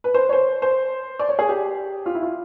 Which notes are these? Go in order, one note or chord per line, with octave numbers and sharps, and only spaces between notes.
B4
C5
C#5
C5
C5
D5
C#5
G#4
G4
F4
E4
F4